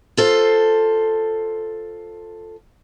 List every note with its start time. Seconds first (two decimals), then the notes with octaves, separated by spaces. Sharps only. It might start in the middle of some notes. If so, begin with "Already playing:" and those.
0.17 F4 A4 C5